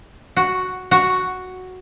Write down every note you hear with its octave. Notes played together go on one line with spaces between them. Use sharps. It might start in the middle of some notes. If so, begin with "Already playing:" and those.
F#4
F#4